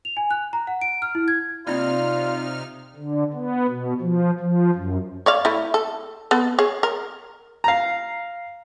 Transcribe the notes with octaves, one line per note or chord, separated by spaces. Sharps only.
F7
G#5
F#6
A#5
F#5
D7
F6
E4
G#6
C3 A#3 C4 D#4 F4 D5 B5 F6
D3
B3
B2
F3
F3
F#2
C#5 D5 F5
A3 E4
A4
B3 A4
G#4 C#5
A#4
F5 A#5